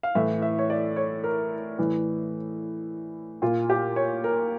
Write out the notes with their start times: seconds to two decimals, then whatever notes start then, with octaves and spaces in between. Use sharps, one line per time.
0.03 F5
0.15 A2 E3 E5
0.42 E5
0.59 C#5
0.70 D5
0.96 C#5
1.24 A#4
1.78 A2 E3
3.42 A#2 F4
3.70 G4
3.96 C#5
4.24 A#4